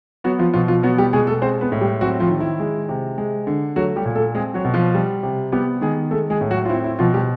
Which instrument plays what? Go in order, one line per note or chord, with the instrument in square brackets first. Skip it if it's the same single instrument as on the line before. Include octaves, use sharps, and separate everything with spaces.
[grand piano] F#3 B3 F#4
F3 F4
B2 F3 F4
F3 F4
F#3 B3 F#4
G3 G4
B2 G#3 G#4
A3 A4
G#3 C4 C5
B3 B4
A2
G3 G4
F#3 C4 F#4
F3 F4
D#3
E4
G#3
C3
G#3
D3
F#3 A3 F#4
G3 G4
A#2
A3 A4
G#3 C4 G#4
F#3 F#4
B2
F3 F4
G3
C3
G3 B3 G4
D#3 G#3 G#4
G#3 A3 A4
G#3 G#4
A2
F#3 F#4
F4
C4 E4
E4
B2 F3 F4
G3 G4